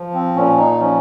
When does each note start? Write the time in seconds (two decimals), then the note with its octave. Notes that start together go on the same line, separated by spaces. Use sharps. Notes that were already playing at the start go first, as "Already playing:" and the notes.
Already playing: F3
0.14 C4
0.36 A#2 C#4
0.58 D#4
0.80 F3 C#4